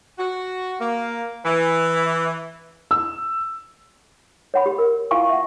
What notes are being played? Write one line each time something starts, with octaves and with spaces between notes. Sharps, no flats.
F#4
A#3
E3
E6
C#5 F#5 B5
G4
A#4
E4 F4 F5 G#5 C#6
E5 F#5